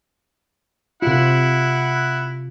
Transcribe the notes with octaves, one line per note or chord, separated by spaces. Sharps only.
C3 E4 F4 F#5